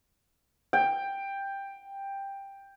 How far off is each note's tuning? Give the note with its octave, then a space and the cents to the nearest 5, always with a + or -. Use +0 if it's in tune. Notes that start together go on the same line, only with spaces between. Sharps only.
G5 +10